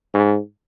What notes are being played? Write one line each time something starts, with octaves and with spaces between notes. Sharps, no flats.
G#2